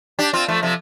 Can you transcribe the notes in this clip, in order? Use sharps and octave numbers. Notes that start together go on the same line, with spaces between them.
D4 G4
C4 F4
F3 A3
C3 F3